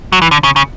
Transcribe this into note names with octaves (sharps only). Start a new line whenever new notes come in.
F#3
E3
D3
C#3
C#3